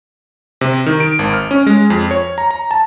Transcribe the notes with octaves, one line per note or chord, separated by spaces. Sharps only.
C3
D#3
D7
G#1
F6
C#4
G#3
F2
C#5
A#5
A#5
A5